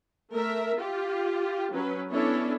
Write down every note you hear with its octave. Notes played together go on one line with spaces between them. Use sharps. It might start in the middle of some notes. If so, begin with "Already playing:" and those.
A3 A#4 E5
F4 G4
F#3 C#4 B4
B3 C#4 D4 E4 A4 C#5